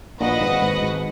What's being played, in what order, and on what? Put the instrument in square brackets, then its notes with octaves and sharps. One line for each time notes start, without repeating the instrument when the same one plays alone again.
[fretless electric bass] A#1 A#2 [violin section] F#4 B4 D#5 F#5
[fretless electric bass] G#1 G#2
G#1 G#2
G#1 G#2